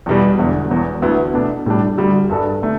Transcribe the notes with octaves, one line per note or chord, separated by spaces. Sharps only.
E2 B2 G3
E1 E2 D3
E1 E2 E3
D2 D3 B3 E4
B2 A3 D4
A2 G3 D4
D2 D3 G3
G2 G3 D4 A4
D3 A3